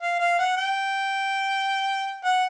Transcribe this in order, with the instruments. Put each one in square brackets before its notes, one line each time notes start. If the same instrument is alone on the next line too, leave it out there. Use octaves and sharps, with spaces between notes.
[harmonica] F5
F5
F#5
G5
F#5